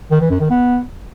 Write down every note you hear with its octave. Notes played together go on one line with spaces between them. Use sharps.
D#3
E3
F#2
D#3
B3